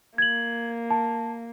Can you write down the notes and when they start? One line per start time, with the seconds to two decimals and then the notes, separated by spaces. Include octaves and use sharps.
0.18 A#3 G#6 F#7
0.91 A5